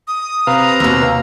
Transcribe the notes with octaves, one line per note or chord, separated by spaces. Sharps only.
D#6
C3 B4 F5 A#5
D#2 B2 E6